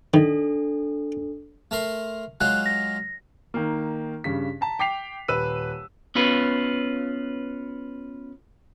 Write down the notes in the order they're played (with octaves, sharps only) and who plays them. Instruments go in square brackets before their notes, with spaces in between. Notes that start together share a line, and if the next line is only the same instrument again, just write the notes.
[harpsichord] D#3 [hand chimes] D4 A4
[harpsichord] A3 A#4 C6
[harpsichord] F#3 G#3 F4 [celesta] F#6
[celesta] A#6
[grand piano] D#3 A#3
G2 C#3 B6
A5 A#5
G5 D6 B6 C7 F7
D#1 B4 E6 D#7
[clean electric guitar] B3 C#4 F4 B4